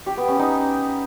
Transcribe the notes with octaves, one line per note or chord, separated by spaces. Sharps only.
G4
B3
C#4
D#4